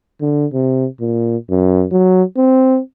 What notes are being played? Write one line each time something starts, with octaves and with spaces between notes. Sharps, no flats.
D3
C3
A#2
F#2
F#3
C4